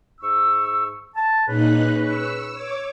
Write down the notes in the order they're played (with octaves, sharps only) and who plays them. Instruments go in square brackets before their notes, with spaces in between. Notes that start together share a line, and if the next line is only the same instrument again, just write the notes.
[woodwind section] G#2 C#6 E6
A5
[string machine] A#2 D#4 F#6 [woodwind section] C#4 G#4 B4
[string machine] C#6 E6
C#5 D6